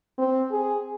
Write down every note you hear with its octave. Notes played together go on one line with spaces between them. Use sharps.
C4
G#4